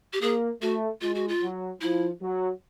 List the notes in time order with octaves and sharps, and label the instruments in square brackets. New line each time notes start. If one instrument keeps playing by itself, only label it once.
[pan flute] G4
[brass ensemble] A#3 [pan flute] G#4
[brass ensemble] A3 [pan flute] F#4
[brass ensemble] G#3 [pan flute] F4
[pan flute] F#4
F4
[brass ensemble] F#3
[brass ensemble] F3 [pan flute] E4
[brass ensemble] F#3